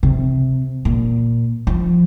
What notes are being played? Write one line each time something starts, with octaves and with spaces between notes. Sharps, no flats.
C3
A#2
F3